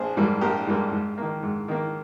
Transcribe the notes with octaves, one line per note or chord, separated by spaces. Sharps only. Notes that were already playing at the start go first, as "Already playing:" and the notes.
Already playing: A#1 G#4 C5
G#2 G3 A#3
A#1 G4 A#4
G#2 G3 A#3
G#2
D#3 A#3
G#2
D#3 A#3